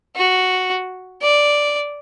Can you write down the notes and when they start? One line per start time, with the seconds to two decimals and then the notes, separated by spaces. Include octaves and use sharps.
0.16 F#4
1.22 D5